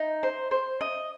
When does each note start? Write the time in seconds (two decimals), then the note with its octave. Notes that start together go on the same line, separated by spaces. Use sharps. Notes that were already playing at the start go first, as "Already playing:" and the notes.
Already playing: D#4
0.23 C5
0.51 C5
0.81 D#5